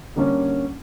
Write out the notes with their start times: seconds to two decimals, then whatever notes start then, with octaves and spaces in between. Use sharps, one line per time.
0.16 D3 G3 A#3 C#4